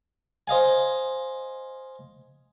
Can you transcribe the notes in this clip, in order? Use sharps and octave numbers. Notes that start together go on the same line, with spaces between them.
C5 D#5 F5 G#5